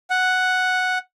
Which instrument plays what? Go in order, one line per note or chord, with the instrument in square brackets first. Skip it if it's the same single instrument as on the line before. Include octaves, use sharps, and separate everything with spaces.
[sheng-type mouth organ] F#5